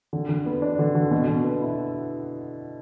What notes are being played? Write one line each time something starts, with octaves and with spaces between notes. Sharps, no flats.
D3
D3
B3
D4
D3
D3
B2
B2
B3
E4